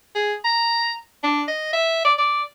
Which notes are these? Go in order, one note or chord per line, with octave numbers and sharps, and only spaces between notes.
G#4
A#5
D4
D#5
E5
D5
D5